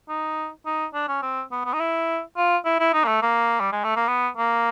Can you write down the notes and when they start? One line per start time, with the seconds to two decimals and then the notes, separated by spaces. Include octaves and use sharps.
0.09 D#4
0.66 D#4
0.94 D4
1.08 C#4
1.22 C4
1.52 B3
1.65 B3
1.74 D#4
1.80 E4
2.37 F4
2.65 E4
2.80 E4
2.94 D#4
3.04 A#3
3.08 A3
3.22 A#3
3.60 G3
3.72 G#3
3.84 A3
3.96 A#3
4.08 B3
4.37 A#3